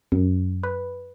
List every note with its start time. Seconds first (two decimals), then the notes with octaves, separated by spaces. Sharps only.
0.12 F#2
0.63 B4